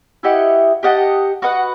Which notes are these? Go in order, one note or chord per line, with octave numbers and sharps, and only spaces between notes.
E4 G4 D#5 F#5
G4 D#5 F#5 A5
F#4 B4 D#5 F#5